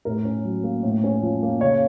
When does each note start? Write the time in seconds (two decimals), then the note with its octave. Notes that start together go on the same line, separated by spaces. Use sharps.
0.05 A2 A#4
0.25 C#4
0.45 F#3
0.64 A#3
0.83 A2
1.04 C#4
1.22 F3
1.43 A#3
1.61 C#3 C#5